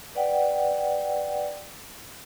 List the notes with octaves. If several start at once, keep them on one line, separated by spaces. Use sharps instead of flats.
B4 D5 F#5 G5